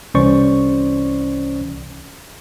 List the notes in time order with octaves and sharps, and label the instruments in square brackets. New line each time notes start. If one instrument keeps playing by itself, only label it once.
[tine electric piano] C2 E3 C#4 C5 D5 C#6